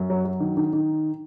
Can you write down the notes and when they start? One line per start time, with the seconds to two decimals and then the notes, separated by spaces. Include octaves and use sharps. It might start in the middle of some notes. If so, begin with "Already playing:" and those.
Already playing: F#2
0.10 F#3
0.25 F#3
0.40 D#3
0.57 D#3
0.73 D#3